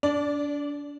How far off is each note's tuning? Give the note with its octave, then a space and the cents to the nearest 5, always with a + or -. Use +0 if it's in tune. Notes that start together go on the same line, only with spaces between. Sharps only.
D4 -30 D5 -5